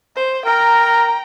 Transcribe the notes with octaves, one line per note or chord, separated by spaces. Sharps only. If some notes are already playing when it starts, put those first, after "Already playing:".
C5
A#4 G5 A#5